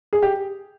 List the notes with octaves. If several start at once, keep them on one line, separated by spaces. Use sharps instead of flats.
G#4
G4